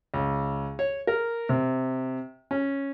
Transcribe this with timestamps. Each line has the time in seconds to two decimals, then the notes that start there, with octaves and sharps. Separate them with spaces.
0.14 C#2
0.79 C#5
1.07 A#4
1.49 C3
2.51 C#4